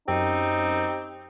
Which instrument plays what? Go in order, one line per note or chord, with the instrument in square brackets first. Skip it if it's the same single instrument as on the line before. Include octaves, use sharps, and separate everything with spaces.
[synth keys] F#2 [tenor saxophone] C4 [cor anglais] D#4 [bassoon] G4